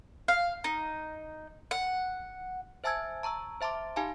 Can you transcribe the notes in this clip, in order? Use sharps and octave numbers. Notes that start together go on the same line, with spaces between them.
F5
D#4
F#5
C5 E5 G#5 A5 E6 G#6
A5 A#5 C#6 E6
C5 E5 A5 C6 D6
D#4 G4 F5 G#5 A5 B5